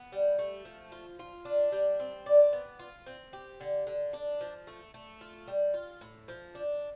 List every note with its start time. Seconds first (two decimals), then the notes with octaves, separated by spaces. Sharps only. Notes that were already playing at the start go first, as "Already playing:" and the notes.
Already playing: B3
0.12 G3
0.39 A3
0.65 F3
0.92 F4
1.19 F4
1.45 D4
1.72 G3
2.00 C4
2.26 D5
2.53 B3
2.79 F4
3.06 C4
3.33 G4
3.61 D3
3.87 D3
4.13 D4
4.41 F3
4.67 A3
4.94 A3
5.21 F4
5.48 G3
5.74 F4
6.01 A2
6.28 F3
6.55 D4